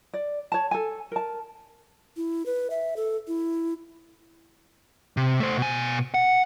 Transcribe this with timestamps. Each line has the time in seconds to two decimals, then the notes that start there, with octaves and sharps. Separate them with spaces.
0.14 D5
0.52 C#5 A5
0.71 A4 G#5
1.12 A#4 A5
2.17 E4
2.46 B4
2.70 E5
2.96 A4
3.28 E4
5.17 C3
5.40 A3 C5
5.58 B2 G#5
6.14 F#5